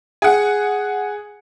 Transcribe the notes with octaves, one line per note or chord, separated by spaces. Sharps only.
G#4 F#5